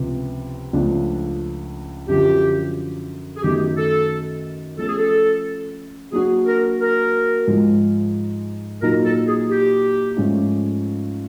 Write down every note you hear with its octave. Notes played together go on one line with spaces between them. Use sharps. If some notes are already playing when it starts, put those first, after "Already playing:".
Already playing: C#2 C3 F3 B3
C#2 C#3 F3 A3 D4
F#2 D3 F3 G4
G#4
F#2 D#3 F#3 A3 G4
A4
F3 A3 C#4 A4
G#4
A4
F#3 A#3 D4 F#4 G#4
A#4
A#4
G#2 F3 G#3
A#2 F#3 A#3 D#4 A#4
A4
G#4
G4
G#2 F3 A3 C#4 F4